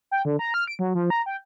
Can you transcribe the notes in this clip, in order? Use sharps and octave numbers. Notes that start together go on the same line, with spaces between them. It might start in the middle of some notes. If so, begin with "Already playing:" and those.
G5
D3
A#5
F6
D7
F#3
F3
A#5
G5